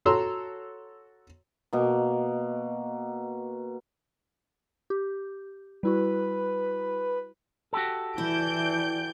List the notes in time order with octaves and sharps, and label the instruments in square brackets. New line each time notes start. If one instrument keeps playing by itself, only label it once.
[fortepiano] F#4 A4 C#5 A#5 C6 E6
[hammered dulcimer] B2 A#3
[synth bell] G4
[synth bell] G3 E4 F#4 [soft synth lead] B4
[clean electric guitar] F#4 G4 A4
[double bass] E3 [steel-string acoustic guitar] E4 [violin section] D5 G6 D7